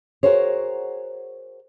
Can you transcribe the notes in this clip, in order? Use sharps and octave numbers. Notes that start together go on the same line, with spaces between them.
F#4 G#4 A#4 C5 C#5